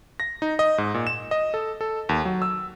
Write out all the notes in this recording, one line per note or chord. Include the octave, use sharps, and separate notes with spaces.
A#6
D#4
D#5
G#2
A#2
E7
D#5
A4
A4
D#2
F#3
E6